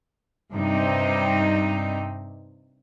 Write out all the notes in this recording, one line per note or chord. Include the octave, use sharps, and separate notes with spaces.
G2 C3 G3 C4 D#4